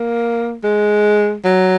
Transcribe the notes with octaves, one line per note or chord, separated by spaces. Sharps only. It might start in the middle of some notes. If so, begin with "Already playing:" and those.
Already playing: A#3
G#3
F#3